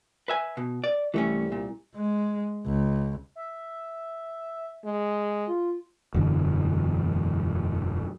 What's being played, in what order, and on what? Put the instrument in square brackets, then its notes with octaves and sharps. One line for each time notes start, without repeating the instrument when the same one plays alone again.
[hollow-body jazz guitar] B4 E5 G#5
B2
D5
[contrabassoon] C2 [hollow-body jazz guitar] E3 A3 C#4
[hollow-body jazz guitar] A#2
[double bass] G#3
C#2
[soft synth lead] E5
[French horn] G#3
[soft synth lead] F4
[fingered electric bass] E1 F#2 D3 E3